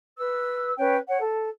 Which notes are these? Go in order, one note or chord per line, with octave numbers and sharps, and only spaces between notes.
B4 E6
C#4 B4 C#5 G5
C#5 F#5
A4